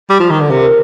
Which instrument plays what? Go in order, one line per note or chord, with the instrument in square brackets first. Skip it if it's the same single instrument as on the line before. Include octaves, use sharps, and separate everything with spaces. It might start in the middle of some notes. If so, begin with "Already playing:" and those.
[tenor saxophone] G3
F3
D#3
D3
[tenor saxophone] C3 [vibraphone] A#4